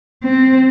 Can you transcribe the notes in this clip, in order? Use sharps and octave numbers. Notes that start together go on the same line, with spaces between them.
C4